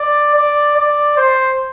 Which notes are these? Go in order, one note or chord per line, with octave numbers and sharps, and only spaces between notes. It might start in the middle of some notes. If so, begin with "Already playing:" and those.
Already playing: D5
D5
D5
C5